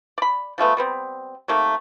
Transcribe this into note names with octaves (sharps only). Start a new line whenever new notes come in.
D5 B5
F3 G#3 A3 B3
G3 B3 C4
C3 D#3 A3 A#3